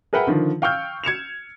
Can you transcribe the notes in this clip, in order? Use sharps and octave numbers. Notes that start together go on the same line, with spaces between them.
G#4 A#4 B4 E5 F#5 G5
D3 D#3 F3
F5 G5 C#6 E6 F6 G6
G#6 C#7 E7 F7